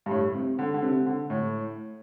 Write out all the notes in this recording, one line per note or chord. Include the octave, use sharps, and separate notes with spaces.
G2
A2
C3
D3
D3
C3
D3
A2